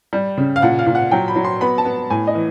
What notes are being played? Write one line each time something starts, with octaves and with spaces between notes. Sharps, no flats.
G3
C#3
F5
A#2 F#5
F5
A#2
F#5
F#3 G5
B5
F#3
C6
B3 B5
A5
B3
A2 G#5
D#5
E3